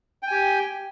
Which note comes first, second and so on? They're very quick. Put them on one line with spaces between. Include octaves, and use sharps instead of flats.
G5 G#5 G4